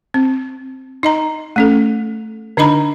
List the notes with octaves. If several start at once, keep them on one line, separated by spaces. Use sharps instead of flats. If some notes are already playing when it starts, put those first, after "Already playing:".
C4
D#4 D#5 A#5
A3 C#4 A4
D3 D4 D#4 D#5 A#5 B5